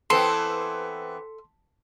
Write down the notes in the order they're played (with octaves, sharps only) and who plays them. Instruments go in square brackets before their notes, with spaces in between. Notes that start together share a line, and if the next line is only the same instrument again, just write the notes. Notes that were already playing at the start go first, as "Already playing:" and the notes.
[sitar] E3 B3 C4 [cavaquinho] A4 [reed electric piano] C6